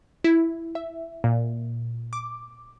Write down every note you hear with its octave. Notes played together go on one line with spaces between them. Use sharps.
E4
E5
A#2
D6